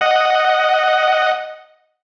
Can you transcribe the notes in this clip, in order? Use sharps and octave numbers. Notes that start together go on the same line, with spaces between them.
D#5 F#5